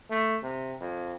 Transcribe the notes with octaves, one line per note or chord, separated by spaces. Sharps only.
A3
C3
F2